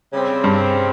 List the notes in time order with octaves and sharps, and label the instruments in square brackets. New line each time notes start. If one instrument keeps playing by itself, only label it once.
[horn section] C#3 G3 C4
[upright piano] G2